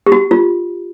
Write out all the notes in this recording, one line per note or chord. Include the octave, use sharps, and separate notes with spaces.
G4
F#4
F4